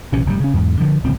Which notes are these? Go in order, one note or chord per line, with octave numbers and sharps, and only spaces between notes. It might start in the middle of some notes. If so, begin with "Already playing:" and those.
A#1 C3 E3 C#4
F1 G2 D3 G3
C#3 C#4
E2 G#2
D3 F3
D1 C#2 C4